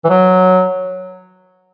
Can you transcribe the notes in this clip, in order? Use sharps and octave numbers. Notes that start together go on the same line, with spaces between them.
E3
F#3